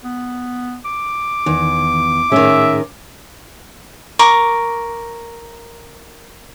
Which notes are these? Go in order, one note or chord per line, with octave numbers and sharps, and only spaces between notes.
B3
D6
E2 D#3
A2 D#3 C#4 G#4 E5
A#4 C#6 D6